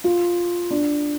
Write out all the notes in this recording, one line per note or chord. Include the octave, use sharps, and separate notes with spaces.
F4
D4